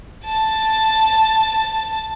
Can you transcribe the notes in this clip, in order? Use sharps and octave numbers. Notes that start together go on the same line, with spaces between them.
A5 A6